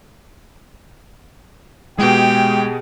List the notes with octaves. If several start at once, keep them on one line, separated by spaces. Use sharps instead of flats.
B2 G#3 G4 G#4 G5